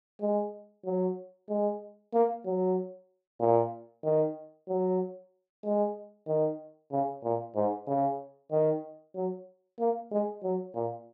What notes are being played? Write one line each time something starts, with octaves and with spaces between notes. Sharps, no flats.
G#3
F#3
G#3
A#3
F#3
A#2
D#3
F#3
G#3
D#3
C#3
A#2
G#2
C#3
D#3
F#3
A#3
G#3
F#3
A#2